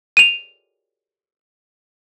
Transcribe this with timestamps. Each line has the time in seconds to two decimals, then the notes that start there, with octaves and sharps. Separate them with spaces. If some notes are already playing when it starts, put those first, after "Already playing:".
0.17 D#7 F7